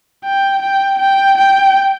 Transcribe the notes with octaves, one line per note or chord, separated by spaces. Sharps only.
G5
G5
G5
G5